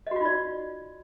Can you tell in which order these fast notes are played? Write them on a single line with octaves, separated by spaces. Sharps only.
D#5 F#4 F4 D#4 D5